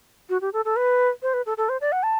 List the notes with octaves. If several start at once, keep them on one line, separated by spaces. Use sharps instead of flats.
F#4
G4
A4
A4
B4
C5
B4
A4
A4
C5
D5
F#5
A5